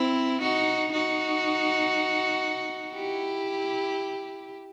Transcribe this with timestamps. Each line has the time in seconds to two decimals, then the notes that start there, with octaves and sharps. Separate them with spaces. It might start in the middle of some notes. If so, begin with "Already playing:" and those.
Already playing: C4 E4
0.42 D#4 F#4
0.93 D#4 F#4
2.94 E4 G4